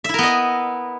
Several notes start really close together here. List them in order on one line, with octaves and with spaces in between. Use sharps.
E5 E4 A#4 B3 D#5